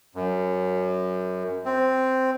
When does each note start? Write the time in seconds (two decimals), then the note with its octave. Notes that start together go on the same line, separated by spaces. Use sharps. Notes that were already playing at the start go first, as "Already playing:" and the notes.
0.15 F#2
1.65 C4